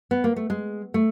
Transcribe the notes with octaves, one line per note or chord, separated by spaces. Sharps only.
B3
A#3
A3
G#3
A3